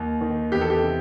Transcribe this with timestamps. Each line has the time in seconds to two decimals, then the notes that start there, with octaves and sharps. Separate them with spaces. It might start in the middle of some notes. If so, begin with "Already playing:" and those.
Already playing: D#2
0.21 D#3
0.52 E2 G4
0.61 A4
0.70 G4
0.82 C3